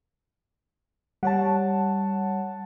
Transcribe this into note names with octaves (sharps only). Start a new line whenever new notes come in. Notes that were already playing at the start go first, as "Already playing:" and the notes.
G3 C#5 F#5 A5